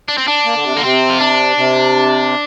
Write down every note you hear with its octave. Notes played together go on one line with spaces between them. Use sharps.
D4
C4
D4
A#3
D3
C3
D3 A#3
C3 C4
F4
D4
C3